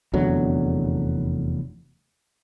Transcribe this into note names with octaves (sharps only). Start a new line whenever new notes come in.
F1 E2 D3 F#3